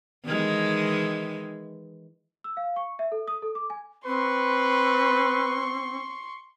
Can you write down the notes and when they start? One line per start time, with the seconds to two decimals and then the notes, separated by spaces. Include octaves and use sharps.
0.25 D#3 E3 G#3
2.44 E6
2.57 F5
2.76 C#6
2.99 E5
3.12 A4
3.28 D#6
3.42 A4
3.55 D6
3.70 G#5
4.06 C4 B4 C6 C#6